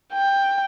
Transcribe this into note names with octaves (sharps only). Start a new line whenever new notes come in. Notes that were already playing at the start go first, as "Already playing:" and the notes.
G5